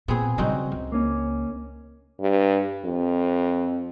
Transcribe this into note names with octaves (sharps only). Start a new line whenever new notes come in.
A#2 B3 C4 G#4
C#3 G3 C4 D#4 F#4
C#2
A#3 C#4
G2
F2